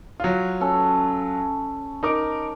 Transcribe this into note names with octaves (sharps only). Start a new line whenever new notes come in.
F#3 F4
C#4 A4
D#4 A#4 D6